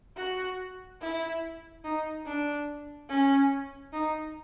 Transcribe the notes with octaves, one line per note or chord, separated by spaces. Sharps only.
F#4
E4
D#4
D4
C#4
D#4